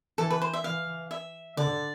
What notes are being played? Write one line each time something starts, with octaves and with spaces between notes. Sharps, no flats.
E3 A4
B4
C5
E5
E3 F5
E5
D3 D5